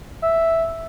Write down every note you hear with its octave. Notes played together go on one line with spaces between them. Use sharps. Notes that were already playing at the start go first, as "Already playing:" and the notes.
E5